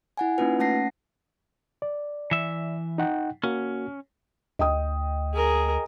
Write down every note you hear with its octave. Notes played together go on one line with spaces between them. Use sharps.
E4 F#5 G#5
A#3 C#4 D#4 F4 B4
A3 C#4 F#5 A5 A#6 C7
D5
E3 E5
D#4 F#5 G5
A#3 C#4 F#4
D2 D#5 G5 D#6
G#4 A#4